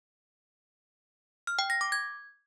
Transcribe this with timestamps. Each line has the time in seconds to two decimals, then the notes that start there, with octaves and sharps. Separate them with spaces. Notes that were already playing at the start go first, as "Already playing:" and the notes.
1.47 F6
1.59 G5
1.70 A#6
1.81 D6
1.92 G#6